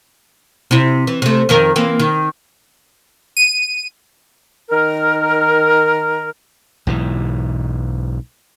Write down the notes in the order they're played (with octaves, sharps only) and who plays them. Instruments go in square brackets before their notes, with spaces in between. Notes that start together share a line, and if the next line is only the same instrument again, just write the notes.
[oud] C3 E4
E3
C3 A3
F2 D#3 A#4
E3 A#3 C4
D#3
[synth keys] D#7
[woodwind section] D#3 A#4
[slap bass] B1 G#2 E3